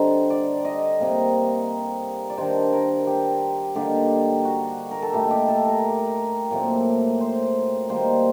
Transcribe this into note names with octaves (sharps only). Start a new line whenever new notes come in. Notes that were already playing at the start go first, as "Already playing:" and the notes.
Already playing: D3 G3 C4 D#4
D5
D#5
C3 G3 A#3
D5
D#3 G3 D4 C5
A#4
G4
D3 G3 A#3 D#4 G4
F#4
A#4
A4
A#2 A3 D#4 G4
G4
A4
A#4
A#2 F#3 A3 C4
C5
D#3 G3 A#3 C5